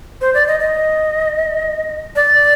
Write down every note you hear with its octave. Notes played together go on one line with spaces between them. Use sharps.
C5
D5
D#5
D#5
D5